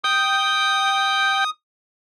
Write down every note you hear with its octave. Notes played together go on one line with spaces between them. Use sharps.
G5 D#6